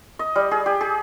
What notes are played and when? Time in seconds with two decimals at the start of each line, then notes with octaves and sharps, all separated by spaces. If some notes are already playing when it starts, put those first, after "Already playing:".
0.19 D#5
0.36 G3
0.51 G#4
0.66 G4
0.81 G#4